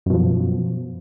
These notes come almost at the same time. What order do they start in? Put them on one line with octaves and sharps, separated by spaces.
F#2 B2 F3